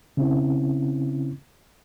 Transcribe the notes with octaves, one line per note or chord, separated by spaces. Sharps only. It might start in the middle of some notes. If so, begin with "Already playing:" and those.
C#3 C4 C#4 E4